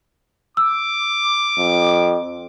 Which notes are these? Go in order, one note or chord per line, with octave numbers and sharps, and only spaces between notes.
D6 E6
F2